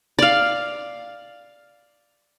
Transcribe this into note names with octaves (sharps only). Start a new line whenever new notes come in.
D5 F5